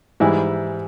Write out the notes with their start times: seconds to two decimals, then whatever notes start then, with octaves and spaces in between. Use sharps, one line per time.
0.20 G#2 E3 G3 E4